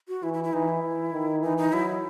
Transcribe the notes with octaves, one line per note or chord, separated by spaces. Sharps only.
F#4
E3 E4
E4
E4
E3 D#4
E4
E3
D#3
E3 D#4
D#4
F#3 E4